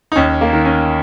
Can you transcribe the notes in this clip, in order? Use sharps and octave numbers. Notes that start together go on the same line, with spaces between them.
D#4
D#2 C#4
A#3
D#3
C#4